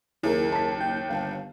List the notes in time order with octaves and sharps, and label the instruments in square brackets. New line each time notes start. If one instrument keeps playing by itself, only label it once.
[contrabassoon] F#1 [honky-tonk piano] D#2 [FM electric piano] E4 G#4 A#4
[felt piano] A5 B6
[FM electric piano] G5 G6
[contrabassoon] G1 [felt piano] F5 A5